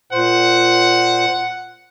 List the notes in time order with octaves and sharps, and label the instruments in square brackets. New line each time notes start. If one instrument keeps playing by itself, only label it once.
[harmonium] A#2 C5 [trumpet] F#5